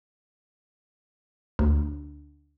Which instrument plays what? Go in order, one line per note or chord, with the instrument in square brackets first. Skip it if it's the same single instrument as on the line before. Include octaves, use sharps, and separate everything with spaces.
[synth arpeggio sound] D2